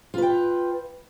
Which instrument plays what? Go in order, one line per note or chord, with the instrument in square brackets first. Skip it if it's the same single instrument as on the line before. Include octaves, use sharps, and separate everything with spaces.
[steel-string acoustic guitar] F4
B4
G5